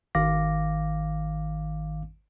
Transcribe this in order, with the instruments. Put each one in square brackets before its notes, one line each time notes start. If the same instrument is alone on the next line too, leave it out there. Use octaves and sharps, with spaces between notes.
[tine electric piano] G#1 D#3 F5 D6 A#6